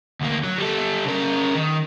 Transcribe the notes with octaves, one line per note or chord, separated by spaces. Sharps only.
D2 A#3
F#3
G3 A4
C#3 A#4
D#3